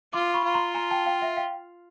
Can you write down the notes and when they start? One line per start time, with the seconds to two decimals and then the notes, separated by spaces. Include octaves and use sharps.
0.13 F4 C6 D6
0.34 B5 C#6
0.44 F4
0.54 A#5 C6
0.74 G#5 A#5
0.90 G5 A5
1.06 F5 G5
1.21 E5 F#5
1.37 F5 G5